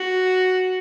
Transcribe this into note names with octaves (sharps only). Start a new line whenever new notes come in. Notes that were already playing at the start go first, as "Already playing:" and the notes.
Already playing: F#4